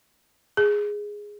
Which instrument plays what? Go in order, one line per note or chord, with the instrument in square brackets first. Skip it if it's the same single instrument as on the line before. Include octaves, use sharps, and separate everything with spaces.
[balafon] G#4